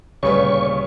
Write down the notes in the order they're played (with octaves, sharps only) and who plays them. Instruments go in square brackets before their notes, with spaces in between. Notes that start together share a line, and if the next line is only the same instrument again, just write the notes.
[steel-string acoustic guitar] D2 A#2 B4 [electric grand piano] C#3 G3 [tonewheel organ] C#5 C#6